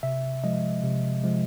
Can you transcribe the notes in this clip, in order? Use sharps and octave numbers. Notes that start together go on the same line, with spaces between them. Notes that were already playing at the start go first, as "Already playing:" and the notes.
C3 E5
F3 G#3 D#5
C3
F3 G#3